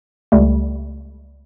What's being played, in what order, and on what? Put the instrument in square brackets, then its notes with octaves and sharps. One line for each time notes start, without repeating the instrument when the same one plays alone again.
[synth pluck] C#2 G3 A3